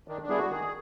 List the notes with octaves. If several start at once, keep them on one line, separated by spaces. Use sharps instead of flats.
D#3 D4
D4
G3 B3 E4 G#4
F#4
D#3 G#4